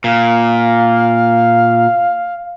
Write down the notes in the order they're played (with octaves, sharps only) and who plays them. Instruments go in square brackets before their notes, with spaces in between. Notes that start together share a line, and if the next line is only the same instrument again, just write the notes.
[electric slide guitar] A#2 [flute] F5